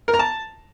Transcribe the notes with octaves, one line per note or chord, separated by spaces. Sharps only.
A#4
A#5
A5